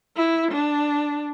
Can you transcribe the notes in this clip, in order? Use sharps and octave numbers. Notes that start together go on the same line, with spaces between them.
E4
D4